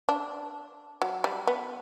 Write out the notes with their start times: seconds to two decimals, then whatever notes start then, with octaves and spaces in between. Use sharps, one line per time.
0.09 D4
1.02 F#3
1.24 G3
1.47 B3